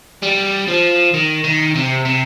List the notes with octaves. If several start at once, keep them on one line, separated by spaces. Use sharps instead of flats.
G3
F3
D#3
D#3
C3
C3